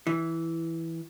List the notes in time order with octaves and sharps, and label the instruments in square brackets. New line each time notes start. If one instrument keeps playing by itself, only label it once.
[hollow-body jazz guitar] E3